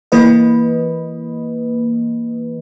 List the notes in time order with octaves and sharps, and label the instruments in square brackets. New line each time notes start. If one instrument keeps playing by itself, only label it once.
[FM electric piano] E3 A#3 B4 D#5